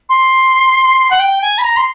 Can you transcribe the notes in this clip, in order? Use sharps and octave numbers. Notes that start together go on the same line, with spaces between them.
C6
F#5
G5
G#5
B5
A#5
C6